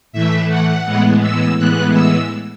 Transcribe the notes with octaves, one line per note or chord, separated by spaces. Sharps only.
A2 E3 A3 E5
F#5
A2 E3 G#3 B3
E6
A2 E3 G#3 B3 F#6
E6